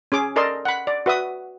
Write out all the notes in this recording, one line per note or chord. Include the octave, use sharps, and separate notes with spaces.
C#4 G#4 D6
A4 A#4 D5 D#5 A5 C6
F#5 B5
D5
F#4 B4 E5 D#6